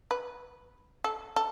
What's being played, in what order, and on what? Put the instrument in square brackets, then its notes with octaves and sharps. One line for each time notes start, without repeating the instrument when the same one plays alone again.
[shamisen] B4
A4
A4